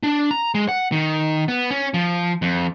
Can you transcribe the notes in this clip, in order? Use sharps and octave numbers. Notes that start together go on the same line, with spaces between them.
D4
A#5
G#3
F#5
D#3
B3
C#4
F3
F2